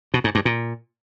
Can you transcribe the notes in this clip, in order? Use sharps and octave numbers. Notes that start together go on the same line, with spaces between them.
B2
G#2
G2
A#2